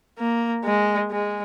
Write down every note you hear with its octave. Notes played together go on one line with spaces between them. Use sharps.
A#3
G#3
G#3